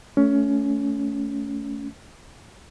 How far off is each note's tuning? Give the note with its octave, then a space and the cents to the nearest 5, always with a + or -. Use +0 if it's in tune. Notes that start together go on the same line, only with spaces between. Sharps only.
A3 +0 C#4 +20